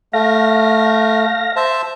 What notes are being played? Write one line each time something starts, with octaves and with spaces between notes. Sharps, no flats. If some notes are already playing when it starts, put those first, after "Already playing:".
A3 F5 A#6
C5 E5 A5